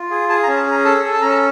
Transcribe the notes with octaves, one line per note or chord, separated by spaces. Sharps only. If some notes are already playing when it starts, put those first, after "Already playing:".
Already playing: F4
G#4
G#4 A5
A#5
C#4
A5
G#4 A#5
A4 A5
A4
A5
C#4 A#5
A5